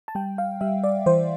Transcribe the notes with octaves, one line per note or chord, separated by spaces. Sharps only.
A5
G3 G5
F5
G3 E5
D5
E3 C5